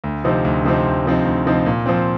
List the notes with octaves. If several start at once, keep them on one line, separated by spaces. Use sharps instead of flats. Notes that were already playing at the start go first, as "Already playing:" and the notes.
D2
C3 F3 C4 D#4
D2
C3 F3 C4 D#4
D2
C3 F3 C4 D#4
D2
C3 F3 C4 D#4
A#2
F3 C4